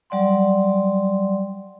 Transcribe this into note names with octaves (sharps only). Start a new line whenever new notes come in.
F#3 G3 D5 F#5 C6